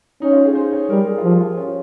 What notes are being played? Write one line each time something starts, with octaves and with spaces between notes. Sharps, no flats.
C#4 D#4
F4
G#4
C5
C#5
G3 A#4
G#4
F4
F3 G4
F4
C#4